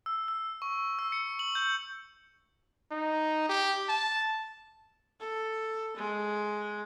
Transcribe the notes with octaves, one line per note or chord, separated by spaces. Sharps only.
E6
E6
C#6
E6
C#7
F#7
G6
D#4
G4
A5
A4
G#3